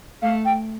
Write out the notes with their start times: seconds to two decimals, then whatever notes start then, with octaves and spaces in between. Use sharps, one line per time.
0.22 A3 F5
0.45 G5